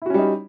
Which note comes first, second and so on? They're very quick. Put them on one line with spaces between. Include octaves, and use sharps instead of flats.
E4 F#4 C#4 G3 D#4